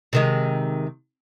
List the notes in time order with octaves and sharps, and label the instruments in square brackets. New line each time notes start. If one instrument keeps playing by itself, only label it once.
[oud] C3 D#3 G#3